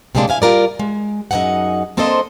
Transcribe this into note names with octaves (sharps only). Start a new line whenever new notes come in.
C3 F#3 G#3 A#3 D4
F3 E4 F5 G#5
G3 F4 A#4 D5
G#3
F#2 D#3 D#4 G#4 F#5
A#3 C4 D4 A4 C5 D#5